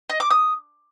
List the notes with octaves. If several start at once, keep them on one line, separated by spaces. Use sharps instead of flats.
D#5
D6
D#6